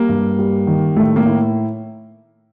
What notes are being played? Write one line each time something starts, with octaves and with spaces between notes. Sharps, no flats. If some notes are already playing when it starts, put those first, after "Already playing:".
Already playing: G3 A#3
G2
G3
D#3
A2 A3
A#3
A2